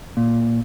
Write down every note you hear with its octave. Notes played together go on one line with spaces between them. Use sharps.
A#2